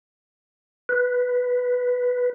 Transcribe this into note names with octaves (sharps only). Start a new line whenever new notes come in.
B4